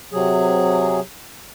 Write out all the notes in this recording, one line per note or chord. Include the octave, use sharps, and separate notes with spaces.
C3 F#3 G#4